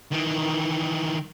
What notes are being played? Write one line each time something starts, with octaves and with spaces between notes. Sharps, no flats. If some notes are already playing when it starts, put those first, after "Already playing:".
D#3 E3